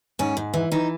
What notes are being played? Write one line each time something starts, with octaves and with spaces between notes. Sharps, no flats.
G#2 C#4
G#2
E3
E3 D#4